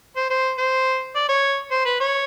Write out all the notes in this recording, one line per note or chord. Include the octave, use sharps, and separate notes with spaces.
C5
C5
C5
D5
C#5
C5
B4
C#5